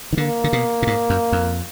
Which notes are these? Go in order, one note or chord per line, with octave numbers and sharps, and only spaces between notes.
D#3
D3 A#3
D3
B2
A#2
G#2
F#2
F2